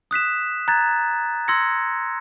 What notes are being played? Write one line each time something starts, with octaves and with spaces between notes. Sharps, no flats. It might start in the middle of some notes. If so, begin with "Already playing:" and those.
D#6 F#6 B6 E7
A#5 F#6 G#6 A6
C6 E6 G#6 A#6 C#7